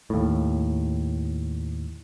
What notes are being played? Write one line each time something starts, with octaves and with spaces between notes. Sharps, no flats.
D#2 A2